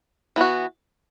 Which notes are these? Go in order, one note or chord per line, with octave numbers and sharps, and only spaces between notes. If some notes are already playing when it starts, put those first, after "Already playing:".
E3 B3 F#4